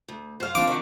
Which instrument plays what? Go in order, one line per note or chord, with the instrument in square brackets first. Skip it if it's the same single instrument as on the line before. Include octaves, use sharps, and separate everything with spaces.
[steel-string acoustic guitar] D2
[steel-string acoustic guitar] F#2 [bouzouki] C5 F5
[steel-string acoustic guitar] F3 C4 D4 [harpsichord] D6
[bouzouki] D#3 F#4